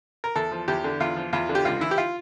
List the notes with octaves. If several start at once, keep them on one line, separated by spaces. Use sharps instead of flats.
A#4
E2 A4
F3
E2 G4
D3
E2 F4
F3
E2 F4
D3
G4
C#2 F4
E3 E4
G4
F4